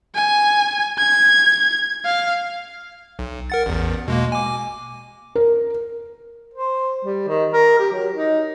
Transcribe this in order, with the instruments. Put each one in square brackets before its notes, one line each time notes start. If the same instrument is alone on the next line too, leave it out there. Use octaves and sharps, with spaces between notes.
[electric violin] G#5
G#6
F5
[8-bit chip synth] B1
A#4 F#5 A6
A1 E2
B2 G#3 A#3
G#5 D6
[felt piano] A#4
[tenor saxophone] C5
G3
D#3
A#4
G4
F#3
D#4